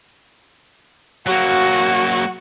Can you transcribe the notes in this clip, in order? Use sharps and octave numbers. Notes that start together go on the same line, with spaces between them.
F#3 A#3 F#4